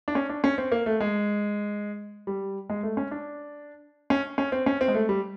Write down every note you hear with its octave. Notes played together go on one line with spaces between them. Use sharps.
D4
C#4
D4
C#4
C4
A#3
A3
G#3
G3
G#3
A3
C#4
D4
C#4
C#4
C4
C#4
C4
G#3
A3
G3